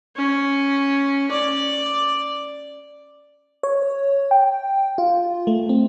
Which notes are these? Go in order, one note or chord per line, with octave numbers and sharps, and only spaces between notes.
C#4
D5
C#5
G5
F4
A3
C4